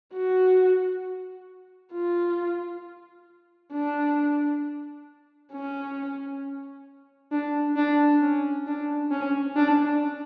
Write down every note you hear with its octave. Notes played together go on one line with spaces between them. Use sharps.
F#4
F4
D4
C#4
D4
D4
C#4
D4
C#4
D4